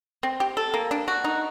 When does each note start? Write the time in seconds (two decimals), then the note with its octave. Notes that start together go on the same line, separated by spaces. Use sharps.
0.23 C4
0.40 G4
0.57 A4
0.74 A#3
0.91 D4
1.08 F#4
1.24 D#4